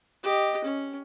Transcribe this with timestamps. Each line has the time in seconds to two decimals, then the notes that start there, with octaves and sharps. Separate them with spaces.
0.23 G4 D#5
0.64 C#4